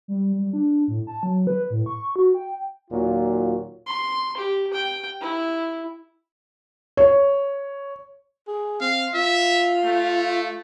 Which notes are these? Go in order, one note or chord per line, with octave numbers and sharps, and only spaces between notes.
G3
G3
D4
A2
A5
F#3
B4
A2
C#6
F#4
G5
D#2 A#2 F#3 F4
C6
G4
G5
E4
C#5
G#4
C4 F5
F4 E5
A3